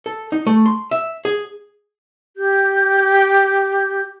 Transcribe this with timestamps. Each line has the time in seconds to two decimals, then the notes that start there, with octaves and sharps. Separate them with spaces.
0.06 A4
0.32 D#4
0.47 A3
0.66 C6
0.91 E5
1.25 G#4
2.38 G4 G6